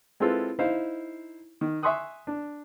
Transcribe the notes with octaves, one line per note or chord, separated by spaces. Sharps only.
G#3 C4 E4 F4 A4 B4
D#4 E4 C5 F5
D#3
E5 G#5 C6 C#6 D#6 F#6
D4